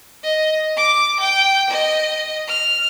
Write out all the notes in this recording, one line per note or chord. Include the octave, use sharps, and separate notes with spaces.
D#5
D6
G5
D#5
F6